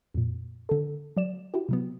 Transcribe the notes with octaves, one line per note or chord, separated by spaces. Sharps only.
F2 A#2
D3 A4
F#3 D5 E7
E4 F#4 G4
C3 F#3 B3